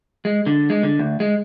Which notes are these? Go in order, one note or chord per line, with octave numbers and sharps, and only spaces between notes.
G#3
D3
G#3
D3
D2
G#3